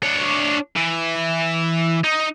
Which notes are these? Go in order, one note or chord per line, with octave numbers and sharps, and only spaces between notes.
D4 C#5
E3
D#4